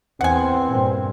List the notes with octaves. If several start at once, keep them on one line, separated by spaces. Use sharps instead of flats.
E2 C4 F#5 G#5
G2 A#2